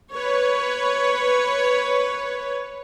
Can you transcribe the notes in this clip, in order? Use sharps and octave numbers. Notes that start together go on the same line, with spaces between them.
B4 C#5